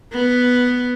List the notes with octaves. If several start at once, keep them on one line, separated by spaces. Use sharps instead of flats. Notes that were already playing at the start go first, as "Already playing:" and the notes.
B3